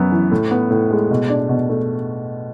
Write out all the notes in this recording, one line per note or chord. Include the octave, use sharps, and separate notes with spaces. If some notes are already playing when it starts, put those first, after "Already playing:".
Already playing: F#2 B3
E3
A2
B3
A2
G#3
B2
D4
B2
A3